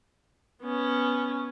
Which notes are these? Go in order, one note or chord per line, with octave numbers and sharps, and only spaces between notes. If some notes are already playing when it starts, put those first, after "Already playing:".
B3 C#4